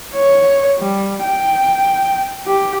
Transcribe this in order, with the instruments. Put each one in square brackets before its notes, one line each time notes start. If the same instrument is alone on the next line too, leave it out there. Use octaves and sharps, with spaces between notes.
[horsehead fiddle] C#5
G3
G5
G4